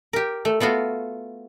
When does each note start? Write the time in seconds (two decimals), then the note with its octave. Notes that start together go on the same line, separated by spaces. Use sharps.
0.13 G4 A#4
0.45 A3
0.60 A3 B3 F4 F#4